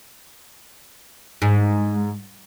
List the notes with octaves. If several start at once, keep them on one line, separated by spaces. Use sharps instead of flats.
G#2